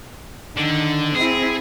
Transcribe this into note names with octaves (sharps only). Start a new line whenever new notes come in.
D3 D#3
C4 E4 G#4